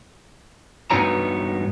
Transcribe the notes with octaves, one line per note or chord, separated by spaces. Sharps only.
G2 B3 D#4 F#4 C#5 A#5